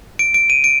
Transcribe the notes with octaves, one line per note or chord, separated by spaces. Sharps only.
D7
D7
D#7
D7